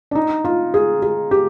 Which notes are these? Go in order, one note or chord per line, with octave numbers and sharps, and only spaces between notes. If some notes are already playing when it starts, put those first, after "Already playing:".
D4
D#4
F4
G#4
G#4
G4